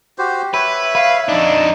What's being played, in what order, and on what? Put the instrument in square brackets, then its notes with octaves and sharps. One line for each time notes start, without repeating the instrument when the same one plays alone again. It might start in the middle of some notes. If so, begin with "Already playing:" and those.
[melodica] F#4 G4 C5
[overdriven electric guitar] B4 [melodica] C#5 E5
[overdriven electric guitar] B4 [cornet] F5
[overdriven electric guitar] F2 D4 [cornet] D#4